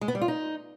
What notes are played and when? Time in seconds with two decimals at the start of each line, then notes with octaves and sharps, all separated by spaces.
0.01 G#3
0.08 B3
0.15 G3
0.21 F4
0.28 D#4